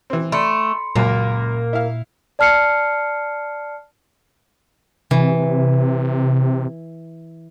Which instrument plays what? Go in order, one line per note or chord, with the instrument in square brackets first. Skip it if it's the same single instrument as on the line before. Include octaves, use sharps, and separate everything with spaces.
[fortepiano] E3 C4
[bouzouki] A3 [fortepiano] D5 [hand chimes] B5 C6 C#7
[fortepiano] C#2 F#2 G#5 [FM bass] A#2 [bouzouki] A#3
[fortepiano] E4 F5
[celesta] D5 A5 F6 C7 C#7
[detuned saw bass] C3 [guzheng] E3